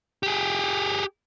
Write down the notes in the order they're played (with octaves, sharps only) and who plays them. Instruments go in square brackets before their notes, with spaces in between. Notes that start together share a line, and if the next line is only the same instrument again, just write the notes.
[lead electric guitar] G4 G#4